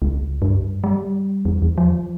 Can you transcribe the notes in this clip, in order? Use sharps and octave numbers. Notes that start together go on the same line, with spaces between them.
C#2
G2
G3
E2
E2
F3